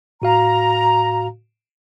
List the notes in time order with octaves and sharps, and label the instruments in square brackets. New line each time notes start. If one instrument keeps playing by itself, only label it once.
[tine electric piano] A2 F#4 F5 [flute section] A#5